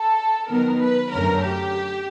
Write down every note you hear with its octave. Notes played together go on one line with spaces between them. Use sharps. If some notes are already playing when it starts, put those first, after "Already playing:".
Already playing: A4
D#3 F#3 B3 A#4
B4
F#2 D3 F#3 A3 C#4 A#4
G4